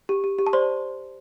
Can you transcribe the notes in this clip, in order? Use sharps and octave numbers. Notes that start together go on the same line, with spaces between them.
G4
G4
G4
A5
C5 D5 C6